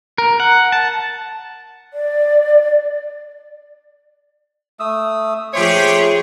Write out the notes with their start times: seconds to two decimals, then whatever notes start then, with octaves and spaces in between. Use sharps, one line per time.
0.18 A#4
0.40 F#5
0.72 A5
1.94 D5
4.80 A3 D#6 E6
5.54 F3 A3 F4 G4 G#4 C5 C#5